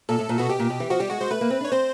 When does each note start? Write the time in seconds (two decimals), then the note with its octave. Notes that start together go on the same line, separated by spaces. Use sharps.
0.09 A#2 A4
0.19 A2
0.29 A#2
0.38 B2 F#4
0.49 B2 G4
0.59 A#2
0.70 B2
0.80 E3
0.90 F3 F#4
1.00 G3 G4
1.10 G#3 F#4
1.21 G#3 C5
1.31 A3 B4
1.41 A#3
1.50 C4
1.61 D4
1.65 C#5
1.72 C4 C5